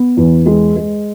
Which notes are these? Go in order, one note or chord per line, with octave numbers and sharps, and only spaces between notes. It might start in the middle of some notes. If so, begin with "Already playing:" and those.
Already playing: B3
E2
G#3
G#3